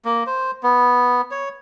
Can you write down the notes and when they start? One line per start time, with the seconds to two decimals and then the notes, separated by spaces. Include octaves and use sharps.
0.05 A#3
0.27 C5
0.63 B3
1.31 C#5